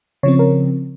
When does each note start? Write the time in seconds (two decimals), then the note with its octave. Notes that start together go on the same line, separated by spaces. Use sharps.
0.23 C#3 F3 C4 C#5
0.39 A#4